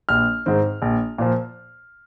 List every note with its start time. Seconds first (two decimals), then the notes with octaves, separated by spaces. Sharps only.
0.09 A#1 F6
0.46 G#2 D#3 C4
0.82 A#1
1.18 A#2 F3